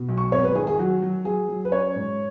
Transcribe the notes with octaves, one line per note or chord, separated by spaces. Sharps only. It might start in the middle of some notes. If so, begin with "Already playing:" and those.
Already playing: B2
B1
C#6
G#1 C#5
B4
D#3 G#4
G#4
F#3 F#4
F#3
F#3 G#4
F#3
B4
C#4 C#5
G#2